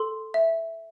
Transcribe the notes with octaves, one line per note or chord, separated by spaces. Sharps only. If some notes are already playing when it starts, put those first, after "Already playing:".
Already playing: A4 C6
E5